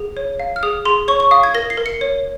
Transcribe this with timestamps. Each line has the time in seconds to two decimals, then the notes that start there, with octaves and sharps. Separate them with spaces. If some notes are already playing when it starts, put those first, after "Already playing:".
Already playing: G#4
0.17 C#5
0.40 F5
0.56 F6
0.63 G#4 D#6
0.85 G#4 C6
1.08 C#5 C#6
1.20 C#6
1.31 F5 D#6
1.43 G#6
1.54 A#4 A#6
1.70 C7
1.77 A#4
1.86 C#7
2.01 C#5